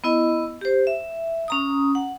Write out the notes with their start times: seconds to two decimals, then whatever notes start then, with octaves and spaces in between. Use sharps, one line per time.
0.04 B3 E4 D#5
0.61 G4 C5
0.87 E5
1.48 C#4 A#5 D#6
1.95 F#5